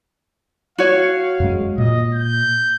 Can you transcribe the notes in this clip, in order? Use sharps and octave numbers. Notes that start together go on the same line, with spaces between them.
F#4 C#5 F5
F#2 G#3
A#2 D#5
G6